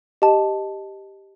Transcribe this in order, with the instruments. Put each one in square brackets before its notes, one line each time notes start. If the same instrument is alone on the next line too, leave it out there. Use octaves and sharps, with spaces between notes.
[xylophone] G4 D#5 A5